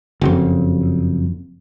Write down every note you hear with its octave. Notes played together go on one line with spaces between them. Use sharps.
F#1 F2